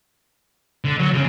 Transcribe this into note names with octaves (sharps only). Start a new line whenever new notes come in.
D3
F#3
C#3